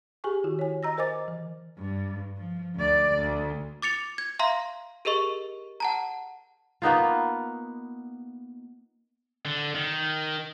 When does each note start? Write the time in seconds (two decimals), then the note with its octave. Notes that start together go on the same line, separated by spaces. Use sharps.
0.24 G4 G#4 G#5 C#6
0.44 D#3 E4 F#4
0.59 C#5 G#5
0.83 D#5 A#5 E6 A#6
0.98 A#4 C5 D#5 G#5 D6 A6
1.28 E3
1.78 G2
2.37 F3
2.76 D2 D5
3.14 D2
3.82 D6 A6 C#7 F7
4.18 G#6
4.39 E5 F5 A#5 C6
5.05 G4 G#4 A#4 D#5 C#6
5.80 F#5 A5 A#5
6.82 A#3 B3 D#4 F4
9.45 D3
9.75 D#3